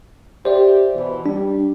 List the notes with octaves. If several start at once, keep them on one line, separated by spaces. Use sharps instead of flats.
G4 C5 D5 E5
B2 E3
G3 D4